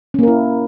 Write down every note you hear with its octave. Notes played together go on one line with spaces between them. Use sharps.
A#3 C#4 E4 A#4